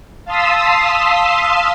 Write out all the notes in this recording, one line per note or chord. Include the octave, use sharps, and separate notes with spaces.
F5 A5 C6 D#6 E6 B6